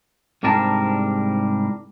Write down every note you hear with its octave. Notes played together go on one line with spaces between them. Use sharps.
C2 G#2 G3 D4 A#4 A5